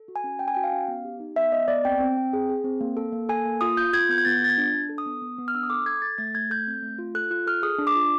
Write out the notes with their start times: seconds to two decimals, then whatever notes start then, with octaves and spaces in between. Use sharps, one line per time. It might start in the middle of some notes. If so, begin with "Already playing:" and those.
Already playing: A4
0.08 F#4
0.16 G#5
0.24 C#4
0.39 C#4 G5
0.48 G#5
0.55 F#4 G5
0.64 F5
0.73 C#4
0.88 B3
1.05 G4
1.20 D#4
1.36 B3 E5
1.52 B3 D#5
1.68 B3 D5
1.85 C4 G5
2.00 C4
2.17 C4
2.33 G#4
2.49 G#4
2.64 C4
2.81 A#3
2.97 A4
3.13 A#3
3.29 A4 G#5
3.45 A#3
3.61 F4 D#6
3.77 F4 G6
3.93 F4 G#6
4.09 B3 G6
4.18 G#6
4.25 B3 A6
4.41 F4 A6
4.49 G#6
4.58 D4
4.74 D4
4.89 A4
4.98 D#6
5.06 B3
5.22 B3
5.38 B3
5.48 F6
5.55 D4 E6
5.63 D#6
5.70 A4 D6
5.86 A4 G#6
6.02 A4 A6
6.18 A3 A6
6.35 A3 G#6
6.50 A4 G6
6.67 C4
6.82 A3
6.99 F4
7.15 A4 F#6
7.30 F4 F#6
7.47 A4 F6
7.63 G#4 D#6
7.79 D4
7.87 D6
7.96 F4